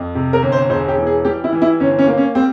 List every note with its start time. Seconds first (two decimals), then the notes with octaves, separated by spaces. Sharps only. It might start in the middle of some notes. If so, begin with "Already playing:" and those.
Already playing: F2
0.15 C3
0.33 A#4
0.42 G1
0.52 C5
0.70 E1 C5
0.89 G4
0.98 E3
1.07 G#4
1.25 G3 G4
1.44 E4
1.52 E3
1.62 E4
1.80 G1 C#4
1.99 C#4
2.07 A#3
2.18 C#4
2.35 G3 C4